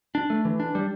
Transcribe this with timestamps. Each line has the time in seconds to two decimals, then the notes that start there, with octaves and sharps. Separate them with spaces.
0.15 D4
0.30 A3
0.45 E3
0.60 D4
0.75 G3